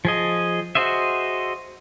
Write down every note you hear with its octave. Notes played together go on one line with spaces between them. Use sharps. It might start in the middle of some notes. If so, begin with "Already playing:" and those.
F3 G#4 D#5
F#4 G#4 C5 D#5 E5